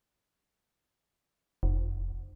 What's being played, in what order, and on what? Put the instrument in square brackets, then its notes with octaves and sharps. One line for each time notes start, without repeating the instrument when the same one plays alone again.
[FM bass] F1